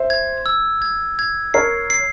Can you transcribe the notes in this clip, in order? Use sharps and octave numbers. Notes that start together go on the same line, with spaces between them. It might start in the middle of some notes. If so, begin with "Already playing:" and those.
Already playing: C5 E5
G#6
E6
G#6
G#6
A#4 C#5 C7
C7